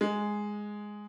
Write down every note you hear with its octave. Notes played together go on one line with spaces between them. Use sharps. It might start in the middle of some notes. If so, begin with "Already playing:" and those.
G#3